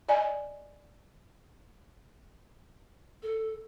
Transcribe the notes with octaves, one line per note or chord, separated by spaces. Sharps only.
D5 D#5 G#5
A4